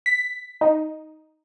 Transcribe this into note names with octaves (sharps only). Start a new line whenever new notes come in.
B6
D#4